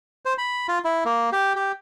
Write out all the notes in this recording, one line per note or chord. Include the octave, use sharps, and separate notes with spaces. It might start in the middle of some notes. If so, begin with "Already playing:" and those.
C5
B5
F4
E4
A#3
G4
G4